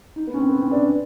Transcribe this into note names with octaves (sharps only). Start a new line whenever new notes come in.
D#4
B3
C#4
C4
B3
C4
D4